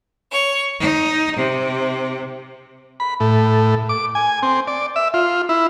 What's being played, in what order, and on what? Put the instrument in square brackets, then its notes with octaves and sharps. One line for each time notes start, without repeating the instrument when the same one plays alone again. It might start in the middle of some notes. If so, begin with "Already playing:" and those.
[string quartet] C#5
D#4
C3
[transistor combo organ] B5
A2
D6
G#5
C4
D5
E5
F4
E4